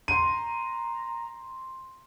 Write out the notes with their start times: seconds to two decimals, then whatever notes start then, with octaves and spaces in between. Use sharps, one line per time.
0.08 A#5 C6 D#7